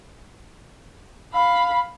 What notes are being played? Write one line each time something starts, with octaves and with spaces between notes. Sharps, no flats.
F5 B5